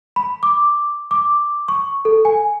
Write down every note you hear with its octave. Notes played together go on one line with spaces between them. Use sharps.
B5
D6
D6
C#6
A4
G#5